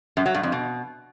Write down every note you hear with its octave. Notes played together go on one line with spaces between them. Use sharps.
F#2
F#3
G2
F2
B2